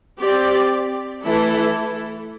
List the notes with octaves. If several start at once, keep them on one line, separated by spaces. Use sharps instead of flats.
C4 G4 D5
E3 A3 E4 A4